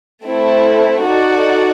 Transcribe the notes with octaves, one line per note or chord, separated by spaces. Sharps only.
A3 C4 E4
D#4 F#4 A4 D5 F#5